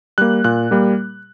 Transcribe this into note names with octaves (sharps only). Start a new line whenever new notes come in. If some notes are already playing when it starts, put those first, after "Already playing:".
G3 A#3 F#6
A#2 F#6
G3 A#3